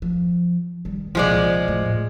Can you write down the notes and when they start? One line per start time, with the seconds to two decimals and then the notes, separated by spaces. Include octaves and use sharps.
0.02 F3
0.85 D#3 G3
1.15 C2 A#2 F3 G#3 D5
1.68 A2 A3